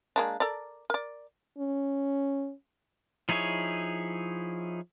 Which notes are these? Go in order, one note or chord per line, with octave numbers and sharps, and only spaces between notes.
G#3 A#3 D4
A4 A#4 D5
A#4 D5
C#4
F3 D#4 E4 G#4 C#5